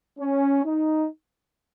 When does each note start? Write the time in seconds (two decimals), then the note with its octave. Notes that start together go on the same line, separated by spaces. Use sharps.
0.18 C#4
0.63 D#4